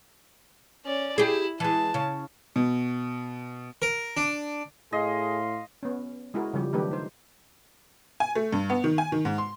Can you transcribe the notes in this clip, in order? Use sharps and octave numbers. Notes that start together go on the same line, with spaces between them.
C#4 D5
E4 G4 G#4
E3 G#3 A5
C#3
B2
A#4
D4
A2 G#4 D#5 F5 C6
B3 C#4
G#3 E4 F#4 G#4 A#4
C#3 F3 G3 G4
D#3 F#3 A3 D4 G4 B4
D#4 C5
G#5
A3
G2
B3
D#3
G#5
D#3
G#2
C6